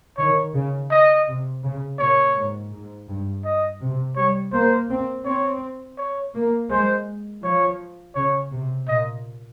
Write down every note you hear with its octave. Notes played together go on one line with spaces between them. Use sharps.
D#3 C#5
C#3
D#5
C3
C#3
A#2 C#5
G#2
G#2
G2
D#5
C3
G3 C#5
A#3 C5
C4
C4 C#5
C#5
A#3
G#3 C5
F3 C#5
C#3 C#5
C3
A#2 D#5